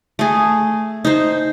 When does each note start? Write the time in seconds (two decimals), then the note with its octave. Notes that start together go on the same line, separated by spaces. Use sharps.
0.19 A3 G#4
1.05 D#4 C5